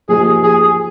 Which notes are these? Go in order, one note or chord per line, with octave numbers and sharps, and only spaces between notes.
F3 A#3 D#4 G4 G#4
G#4